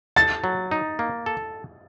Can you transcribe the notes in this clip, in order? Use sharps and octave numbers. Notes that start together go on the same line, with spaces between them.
A4 A6
F#3
D#4
A#3
A4